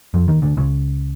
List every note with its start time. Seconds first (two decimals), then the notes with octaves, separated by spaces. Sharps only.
0.14 F2 F3
0.28 D#2 D#3
0.42 D2 D3
0.57 C#2 C#3